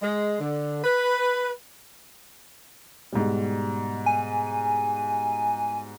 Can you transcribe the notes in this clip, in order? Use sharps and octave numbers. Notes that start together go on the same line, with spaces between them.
G#3
D3
B4
G#2 B2 G3
G#5